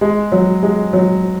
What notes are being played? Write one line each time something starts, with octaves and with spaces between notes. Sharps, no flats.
G#3
F#3
G#3
F#3